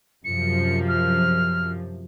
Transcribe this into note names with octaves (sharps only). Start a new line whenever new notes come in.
F#2 C3 F3 C#7
F6